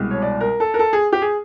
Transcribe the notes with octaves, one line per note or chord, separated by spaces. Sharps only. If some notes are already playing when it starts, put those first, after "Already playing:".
Already playing: C2 B2 G#3
C#5
D5
A#4
A4
A#4
A4
G#4
G4
G#4